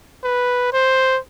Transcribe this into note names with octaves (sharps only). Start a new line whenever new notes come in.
B4
C5